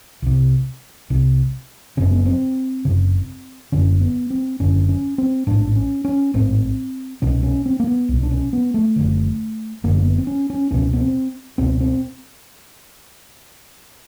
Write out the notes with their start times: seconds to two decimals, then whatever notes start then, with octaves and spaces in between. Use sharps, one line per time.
0.22 C2 C3
1.10 C2 C3
1.97 F#1 F#2 C#3 C4
2.11 B3
2.25 C4
2.85 F#1 F#2 C#3
3.72 F#1 F#2 D3 C#4
4.01 B3
4.30 C4
4.60 F#1 F#2 D3 C#4
4.89 C#4
5.18 C4
5.47 A1 G#2 D4
5.76 C#4
6.05 C#4
6.34 A1 G#2 C4
7.22 C2 B2 C#4
7.43 C#4
7.66 C4
7.80 A#3
7.87 B3
8.09 C2 B2
8.23 D4
8.31 C#4
8.53 B3
8.74 A3
8.96 F#1 F#2 D3
9.83 F#1 F#2 D3 A#3
9.95 A#3
10.05 B3
10.18 C4
10.27 C#4
10.50 C#4
10.71 C#2 B2 C#4
10.93 B3
11.01 C4
11.58 C#2 B2 C4
11.80 C4